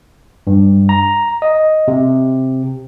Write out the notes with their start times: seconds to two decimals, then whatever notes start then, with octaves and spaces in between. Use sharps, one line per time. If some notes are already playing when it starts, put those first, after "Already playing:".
0.47 G2
0.89 A#5
1.42 D#5
1.88 C3